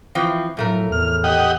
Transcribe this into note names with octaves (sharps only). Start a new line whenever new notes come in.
E3 F3 C4
F2 A2 F#3 A3 A#4
E2 A2 F6
G4 D#5 F#5